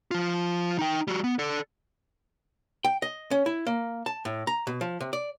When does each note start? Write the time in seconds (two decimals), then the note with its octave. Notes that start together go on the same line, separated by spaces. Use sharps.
0.11 F3 F4
0.79 D#4 G5
1.08 G3 F#4
1.24 B3
1.39 A4 D5
2.84 G5
3.02 D#5
3.31 C#4
3.46 E4
3.67 A#3
4.06 A5
4.25 A2
4.47 A#5
4.67 B2
4.81 F3
5.01 C3
5.13 D5